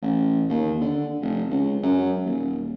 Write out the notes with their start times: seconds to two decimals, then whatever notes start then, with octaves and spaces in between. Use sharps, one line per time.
0.02 A1
0.49 D#2
0.81 D3
1.21 F1
1.50 C#2
1.83 F#2
2.25 D#1